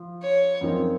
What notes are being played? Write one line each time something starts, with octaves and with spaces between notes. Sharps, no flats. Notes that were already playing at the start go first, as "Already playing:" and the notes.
Already playing: F3
C#5
F#2 F3 C4 D#4 A#4